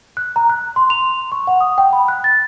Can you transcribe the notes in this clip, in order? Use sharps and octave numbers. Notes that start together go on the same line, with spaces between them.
F#6
A#5
F#6
C6
F7
C#6
F#5
D#6
G5
B5
F#6
A6